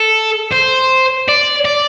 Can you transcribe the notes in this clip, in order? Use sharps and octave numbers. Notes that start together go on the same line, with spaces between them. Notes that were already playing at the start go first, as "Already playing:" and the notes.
Already playing: A4
C5
D5
D5